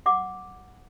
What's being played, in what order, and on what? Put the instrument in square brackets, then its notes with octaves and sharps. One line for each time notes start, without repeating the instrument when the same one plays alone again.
[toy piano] F#5 D6